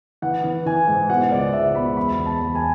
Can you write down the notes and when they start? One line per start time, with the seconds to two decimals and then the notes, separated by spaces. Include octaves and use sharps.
0.22 E3 F#5
0.44 E3
0.66 E3 G#5
0.88 G#2
1.10 B2 F#5
1.31 C#2 D5
1.53 C#2 E5
1.74 B2 B5
1.97 E2 B5
2.18 E2
2.26 A5
2.41 E2
2.55 G#5